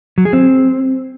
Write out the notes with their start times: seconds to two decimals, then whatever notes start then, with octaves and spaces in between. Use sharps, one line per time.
0.18 F#3
0.25 G#4
0.33 C4